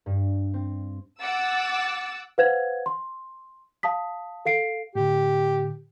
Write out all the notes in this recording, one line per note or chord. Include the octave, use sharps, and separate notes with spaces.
G2
C4
F#5 D6 E6 A6
B4 C5 F5 F#5 G#6
C6
F5 A5 D#6 B6
A4 F5 C7 D7
A2 D3 G4